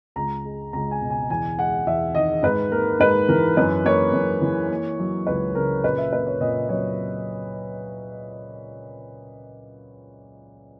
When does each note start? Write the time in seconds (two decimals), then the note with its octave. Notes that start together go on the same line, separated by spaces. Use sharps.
0.16 C#2 A#5
0.45 G#3
0.73 C#2 A#5
0.91 G#5
1.01 B2
1.10 G#5
1.30 E2 G#5
1.58 G#3 F#5
1.86 E2 E5
2.15 D#3 D#5
2.43 G#2 B4
2.71 A#3 A#4
3.00 G#2 B4
3.29 E3 A#4
3.57 F#2 B4
3.85 A#3 C#5
4.13 F#2
4.42 E3
4.70 A#3
4.99 F#3
5.27 C#2 B4
5.55 C#3 A#4
5.84 A#2 B4
5.98 E5
6.12 A#3 B4
6.26 C#5
6.40 A#2 D#5
6.69 F#3 C#5